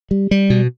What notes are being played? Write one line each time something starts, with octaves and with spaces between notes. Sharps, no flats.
G3
G3
B2